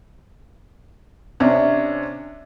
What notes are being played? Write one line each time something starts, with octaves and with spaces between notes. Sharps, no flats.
C3 C#4 D4